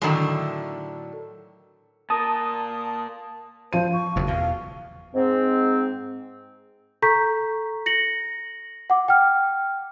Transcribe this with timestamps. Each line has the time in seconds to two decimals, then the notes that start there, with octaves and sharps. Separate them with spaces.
0.02 A2 D3 D#3 F#3 G#3
2.10 A#2 A#4 A5 D#6
3.73 F3 C5 D#7
3.93 C#6
4.16 F#1 F2
4.28 E2 B2 F5
5.13 G#2 C4
7.02 A4 A#5 C#6 G6 B6
7.86 A#6 C#7 F#7
8.90 F#5 D6
9.08 G5 F6